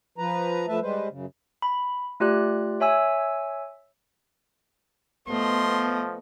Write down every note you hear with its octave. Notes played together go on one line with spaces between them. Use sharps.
F3 B4 A#5
F3 A3 B4 E5 A5
G3 G#3 B4 C5
F#2 C#3
B5
A3 F4 G4 D5 F#6
C#5 E5 G#5 E6
F3 A3 B3 D#5 C6